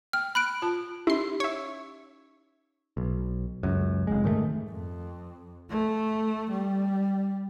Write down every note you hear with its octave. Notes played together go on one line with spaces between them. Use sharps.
G5 F6
B5 F#6 D7
F4 A5
C#4 D#4 E4 G4 C6
C#5 E5
B1
C#2 F#2
F1 G#3
G#2 D#3 G#3 A3
F2
A3
G3